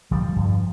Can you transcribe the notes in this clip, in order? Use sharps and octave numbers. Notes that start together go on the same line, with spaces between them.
D3 F3 G3
G2